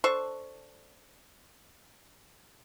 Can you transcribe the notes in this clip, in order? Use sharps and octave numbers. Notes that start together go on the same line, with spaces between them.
D4 A4 C5 C#6